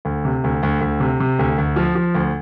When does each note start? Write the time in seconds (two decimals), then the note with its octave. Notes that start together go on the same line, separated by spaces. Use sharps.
0.05 D2
0.25 C3
0.44 D2
0.63 D2
0.81 D2
1.00 C3
1.20 C3
1.39 D2
1.58 D2
1.76 F3
1.95 F3
2.15 D2